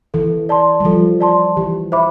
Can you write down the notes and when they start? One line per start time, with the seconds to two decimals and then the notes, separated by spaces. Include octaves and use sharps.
0.14 E3 A4
0.49 D5 A5 C6
0.80 G3
0.85 F3 A4
1.20 D5 A5 C6
1.57 E3 G4
1.92 C5 E5 B5 D6